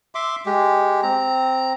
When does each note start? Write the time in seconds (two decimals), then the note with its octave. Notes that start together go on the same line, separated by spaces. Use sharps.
0.15 E5 C6 D6
0.46 G#3 G4
1.03 C4 A#5